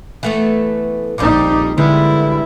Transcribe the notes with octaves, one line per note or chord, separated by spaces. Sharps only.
E3 A3 B3
A#1 F2 F3 G3 D#4 D6
D3 G3 G#3 B3 E4